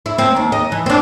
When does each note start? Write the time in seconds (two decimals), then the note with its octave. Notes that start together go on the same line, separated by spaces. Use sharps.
0.06 E4
0.18 C4
0.36 D#2
0.52 D#5
0.72 E3
0.86 C4 D4